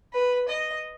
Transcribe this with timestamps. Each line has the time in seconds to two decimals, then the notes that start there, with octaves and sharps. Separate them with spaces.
0.13 B4
0.49 D#5